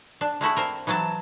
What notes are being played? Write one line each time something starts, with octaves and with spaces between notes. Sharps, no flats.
D4
G#3 A3 E4 F#4
C4 A#4
E3 F#3 A5